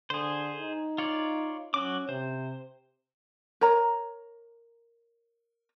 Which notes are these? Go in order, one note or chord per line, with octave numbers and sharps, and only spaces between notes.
D3 G#4 C5
D#4
F4 C#5 D5
F#3 C#4 F#4 D6
C3 C5
A#4 C#5 A#5